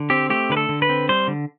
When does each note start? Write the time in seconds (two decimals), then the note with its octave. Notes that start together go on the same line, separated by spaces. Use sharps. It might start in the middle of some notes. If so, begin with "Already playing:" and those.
Already playing: D3
0.10 C4 G4
0.30 A3 G4
0.50 D3 B4
0.57 A4
0.69 D3
0.82 B4
0.89 C4
1.09 G3 C5
1.28 D3